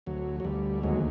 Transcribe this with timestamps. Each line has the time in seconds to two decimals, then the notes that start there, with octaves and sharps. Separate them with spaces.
0.07 D2 F#3
0.40 F#3
0.44 D2 G3
0.83 D#2 F#3 G#3